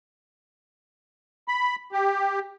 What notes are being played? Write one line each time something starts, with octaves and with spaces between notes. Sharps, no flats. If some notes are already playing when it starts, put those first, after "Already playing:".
B5
G4